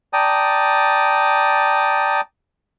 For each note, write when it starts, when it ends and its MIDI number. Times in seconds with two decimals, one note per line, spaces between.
0.13 2.21 74
0.13 2.21 79
0.13 2.21 81
0.13 2.21 82
0.13 2.21 87